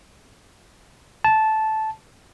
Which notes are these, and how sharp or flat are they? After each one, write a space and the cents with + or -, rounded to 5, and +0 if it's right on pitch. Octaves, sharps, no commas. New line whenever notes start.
A5 -10